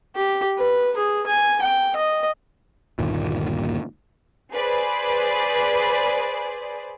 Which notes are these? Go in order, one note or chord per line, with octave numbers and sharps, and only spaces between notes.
G4
B4
G#4
G#5
G5
D#5
G1 D#2 A#2
G#4 B4 C5 D5